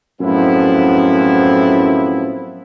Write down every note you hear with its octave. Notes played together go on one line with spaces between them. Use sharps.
F#2 A2 F3 B3 C4 E4